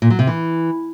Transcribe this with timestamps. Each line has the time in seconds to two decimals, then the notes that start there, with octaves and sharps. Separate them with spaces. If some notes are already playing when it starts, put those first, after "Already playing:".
0.02 A#2
0.10 F#3
0.19 C3
0.27 E3